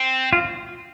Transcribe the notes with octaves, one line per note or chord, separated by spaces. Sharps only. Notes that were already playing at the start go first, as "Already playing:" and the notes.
Already playing: C4
F4